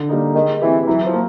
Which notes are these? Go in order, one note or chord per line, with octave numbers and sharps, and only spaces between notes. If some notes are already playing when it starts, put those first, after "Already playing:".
Already playing: D3
G3 A#3 D#4
D#3 G#3
E3 C4 E4 G4
E3 F#3
F3
A#3